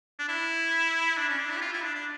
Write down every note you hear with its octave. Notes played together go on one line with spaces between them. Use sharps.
D4
E4
D4
C#4
D4
E4
G4
F4
E4
D4
D4